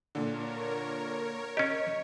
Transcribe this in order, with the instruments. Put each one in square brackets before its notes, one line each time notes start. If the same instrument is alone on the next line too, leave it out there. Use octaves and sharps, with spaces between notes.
[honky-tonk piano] A#2 D3 [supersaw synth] A#4 C#5
[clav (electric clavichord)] C#4 G4 [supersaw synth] C#5 [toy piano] D#5